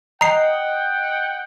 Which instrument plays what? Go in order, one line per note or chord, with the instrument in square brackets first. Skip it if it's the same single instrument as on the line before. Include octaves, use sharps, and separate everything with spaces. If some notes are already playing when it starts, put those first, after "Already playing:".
[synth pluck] D#5 [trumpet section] F#5 G5 [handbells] A#5 C7